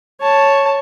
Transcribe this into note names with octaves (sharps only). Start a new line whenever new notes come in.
C#5 A5